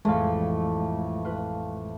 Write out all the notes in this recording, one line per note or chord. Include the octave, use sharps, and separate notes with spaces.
A1 F2 A2 G#3 A3 F5
F4 B4